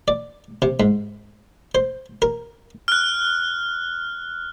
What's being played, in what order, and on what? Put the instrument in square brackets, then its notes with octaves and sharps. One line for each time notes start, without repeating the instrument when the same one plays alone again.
[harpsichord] D5
C3
G#2
C5
A#4
[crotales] F6 F#6